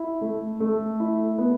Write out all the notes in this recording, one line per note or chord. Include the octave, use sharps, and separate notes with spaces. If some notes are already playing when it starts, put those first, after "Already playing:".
Already playing: E4
A3
A3
E4
B3